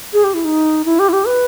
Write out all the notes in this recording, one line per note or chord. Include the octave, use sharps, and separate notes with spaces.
G#4
G4
E4
D#4
E4
G4
E4
G4
B4